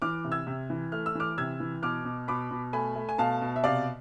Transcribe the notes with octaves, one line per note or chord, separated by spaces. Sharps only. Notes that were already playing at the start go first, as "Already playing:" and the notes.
E3 D6 F6
C3
E6 G#6
C3
E3
A3 F6
E6
E3 D6 F6
C3 E6 G#6
E3
B2 D6 F6
B2
B2 B5 D6
B2
A3 G#5 B5
A3
G#5
B2 F5 A5
B2
E5
C3 D5 F5